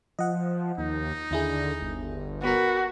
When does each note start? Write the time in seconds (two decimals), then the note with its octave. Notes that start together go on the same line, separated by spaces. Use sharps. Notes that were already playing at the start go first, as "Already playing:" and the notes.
0.19 F3 D#5 F#5
0.78 D#2 D#4
1.31 D#2 D3 E4 G#4
1.81 G1
2.44 B3 F#4 A#4 B5